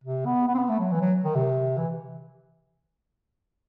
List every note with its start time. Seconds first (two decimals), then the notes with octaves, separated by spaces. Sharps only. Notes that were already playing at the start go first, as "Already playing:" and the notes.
0.04 C3
0.26 B3
0.48 B3
0.55 C4
0.58 B3
0.69 A3
0.80 F#3
0.92 E3
1.01 F#3
1.24 D#3
1.35 C3
1.78 E3